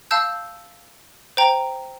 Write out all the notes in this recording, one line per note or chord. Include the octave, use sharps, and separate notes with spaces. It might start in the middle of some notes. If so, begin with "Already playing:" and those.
F5 A5 E6 G6
C5 G5 A#5